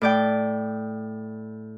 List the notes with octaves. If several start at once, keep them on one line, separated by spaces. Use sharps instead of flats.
A2 D5 G5